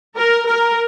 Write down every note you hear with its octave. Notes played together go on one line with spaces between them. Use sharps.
A#4
A#4